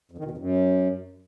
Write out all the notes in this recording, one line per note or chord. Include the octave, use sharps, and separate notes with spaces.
F2
D#3
B2
F2
F#2